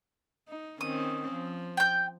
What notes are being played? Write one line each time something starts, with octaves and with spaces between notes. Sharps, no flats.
D#4
D#3 C4 C#4 D#6
F3
G5 G6